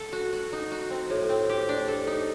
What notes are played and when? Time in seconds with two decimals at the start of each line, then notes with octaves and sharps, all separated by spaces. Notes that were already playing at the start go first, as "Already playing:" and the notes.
Already playing: A4
0.13 F#4
0.33 F#4
0.53 D#4
0.72 F#4
0.90 C4
1.10 A2
1.29 C4
1.49 G4
1.69 D4
1.88 A4
2.07 D#4